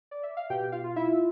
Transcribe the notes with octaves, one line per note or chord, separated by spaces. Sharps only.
D5
E5
F5
B2 G4 G5
F4 F5
F4
E4 E5